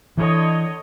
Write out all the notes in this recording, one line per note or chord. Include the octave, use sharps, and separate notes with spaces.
D3 E3 C#5 D#5